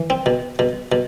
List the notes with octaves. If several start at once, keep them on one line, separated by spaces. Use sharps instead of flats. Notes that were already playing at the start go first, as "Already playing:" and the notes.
Already playing: E3
C4
B2
B2
B2